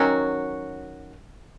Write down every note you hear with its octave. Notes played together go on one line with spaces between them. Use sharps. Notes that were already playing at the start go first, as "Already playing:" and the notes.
Already playing: D#3 F#3 C#4 F#4